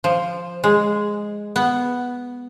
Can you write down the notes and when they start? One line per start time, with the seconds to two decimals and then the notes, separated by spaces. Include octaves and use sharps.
0.04 F3
0.64 G#3
1.56 B3